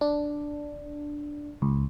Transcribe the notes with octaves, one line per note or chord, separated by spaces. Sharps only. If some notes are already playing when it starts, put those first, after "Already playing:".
D4
C#2